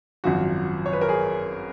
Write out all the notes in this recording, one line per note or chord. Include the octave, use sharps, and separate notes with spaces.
G#1 F#2 F3 F#4
C#5
B4
A#4
G#4